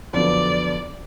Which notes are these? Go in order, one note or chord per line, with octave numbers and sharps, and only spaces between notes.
F2 D3 F#3 B3 D5